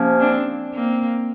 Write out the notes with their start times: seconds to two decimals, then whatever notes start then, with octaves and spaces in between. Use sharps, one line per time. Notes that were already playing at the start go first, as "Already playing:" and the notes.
Already playing: C3 F3 A#3 C#4
0.20 C4 D4
0.74 A#3 C4